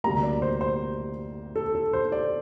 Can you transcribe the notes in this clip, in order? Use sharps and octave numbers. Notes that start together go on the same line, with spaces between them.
D2 C3 G3 A#3 A#5
D5
C5
C5
A4
A4
C5
D5